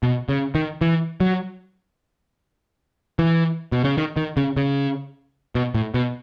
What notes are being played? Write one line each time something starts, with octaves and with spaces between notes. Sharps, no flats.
B2
C#3
D#3
E3
F#3
E3
B2
C#3
D#3
D#3
C#3
C#3
B2
A2
B2